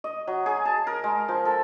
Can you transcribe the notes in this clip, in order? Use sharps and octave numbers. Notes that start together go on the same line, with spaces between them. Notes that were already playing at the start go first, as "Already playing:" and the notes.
D#5
F#3
G#4
A5
A#4
G#3
F3
A4